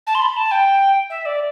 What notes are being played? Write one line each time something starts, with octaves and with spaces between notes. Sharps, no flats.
A5
C6
B5
A5
G5
E5
D5